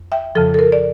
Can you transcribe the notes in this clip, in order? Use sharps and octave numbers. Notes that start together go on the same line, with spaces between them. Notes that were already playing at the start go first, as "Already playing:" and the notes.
Already playing: F2
E5 G5
F2 C#3 F3 A4
A4
A#4
D5